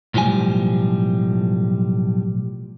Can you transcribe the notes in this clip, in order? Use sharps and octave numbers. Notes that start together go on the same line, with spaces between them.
B1 A2 F3 G3 G#5